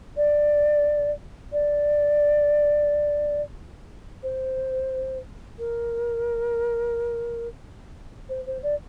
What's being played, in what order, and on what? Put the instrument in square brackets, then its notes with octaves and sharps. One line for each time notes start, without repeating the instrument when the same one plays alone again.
[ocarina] D5
D5
C5
A#4
C5
C5
D5